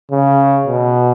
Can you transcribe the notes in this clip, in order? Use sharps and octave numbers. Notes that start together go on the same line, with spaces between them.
C#3
B2